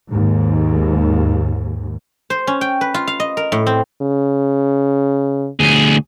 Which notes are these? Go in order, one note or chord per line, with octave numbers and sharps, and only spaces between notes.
D#2 G#2
C5
C#4
G5
B4
F4
F5
D#5
A#4
A2
C4
C#3
D2 G#4